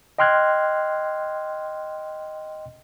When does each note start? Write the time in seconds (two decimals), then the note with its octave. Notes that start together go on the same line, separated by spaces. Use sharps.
0.19 D#5 G5 C6 F6 F#6 G#6